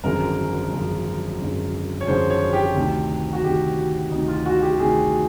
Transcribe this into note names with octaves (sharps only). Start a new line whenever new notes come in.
G#1 F#2 D3 F3 G#3 A#4
G#1 F#2 D3 F3 G#3
G#1 F#2 D3 F3 G#3
C#5
G#1 F#2 D3 F3 G#3 C5
C#5
G4
D2 C3 D#3
F#4
D2 C3 D#3 G4
D2 C3 D#3 D#4
F4
F#4
F#4
G4
D2 C3 D#3 G#4